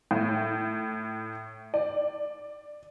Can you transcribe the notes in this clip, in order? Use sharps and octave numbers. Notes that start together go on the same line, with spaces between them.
A2
D5